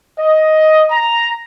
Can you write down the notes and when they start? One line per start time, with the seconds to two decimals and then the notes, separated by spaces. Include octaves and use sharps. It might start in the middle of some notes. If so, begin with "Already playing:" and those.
0.19 D#5
0.91 A#5